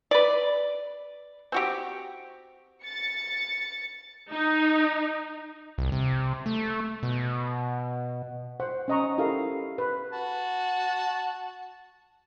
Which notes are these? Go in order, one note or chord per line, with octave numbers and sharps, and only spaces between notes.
B4 D5
C4 F#4 G4
A6 C#7
D#4
C2
C3
A3
B2
C5 F#5
C#4 C5 D#5 F#5 A#5 C#6
E4 G4 A4 A#4 F5
B4
F#4 A5